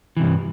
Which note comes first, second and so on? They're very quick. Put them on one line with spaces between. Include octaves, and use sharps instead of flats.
E3 C3 G2